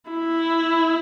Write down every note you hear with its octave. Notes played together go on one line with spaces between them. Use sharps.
E4